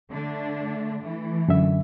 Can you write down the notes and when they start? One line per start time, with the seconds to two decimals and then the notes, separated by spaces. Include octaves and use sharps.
0.12 D3 A3 D4
1.02 E3 A3
1.48 F#2 D3 E5